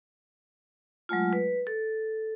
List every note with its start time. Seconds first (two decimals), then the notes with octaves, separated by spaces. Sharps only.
1.09 F#3 G#3 A3 F4
1.33 B4
1.67 A4